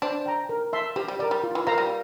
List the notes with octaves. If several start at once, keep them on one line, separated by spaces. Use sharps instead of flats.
D4 C5
G5 A#5
A#4
E5 A5 C6
F3 G4
G3
G3 A#4 D5
G3
F4
E3
F3 A#4 F5 A#5
G3